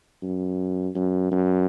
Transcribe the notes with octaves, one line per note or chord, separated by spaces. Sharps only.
F#2
F#2
F#2